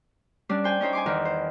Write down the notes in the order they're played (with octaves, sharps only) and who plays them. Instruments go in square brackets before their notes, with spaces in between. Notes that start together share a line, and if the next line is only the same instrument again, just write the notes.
[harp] G3 C#4 D4 D5
C5 G5 G#5
C#4 D#4 C5 C#5
G#5 C6 D6
E2 D#3 F5
C5